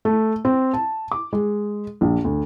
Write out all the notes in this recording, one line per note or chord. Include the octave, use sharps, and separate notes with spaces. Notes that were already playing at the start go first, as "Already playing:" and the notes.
A3
C4
A5
D6
G#3
A#1
D2